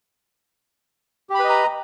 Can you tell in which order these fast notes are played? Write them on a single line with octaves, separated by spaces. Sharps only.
G4 B5 B4 D#5 A#5